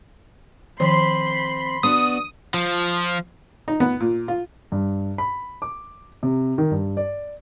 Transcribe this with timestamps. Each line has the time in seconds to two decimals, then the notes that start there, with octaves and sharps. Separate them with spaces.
0.80 D#3 F3 C4 C5 B5 C6
1.83 B3 D4 F#4 D#6
2.54 F3
3.68 D#4
3.80 B3
4.00 A#2
4.28 F4
4.72 G2
5.18 B5
5.62 D6
6.23 C3
6.58 D#3
6.71 G2
6.97 D5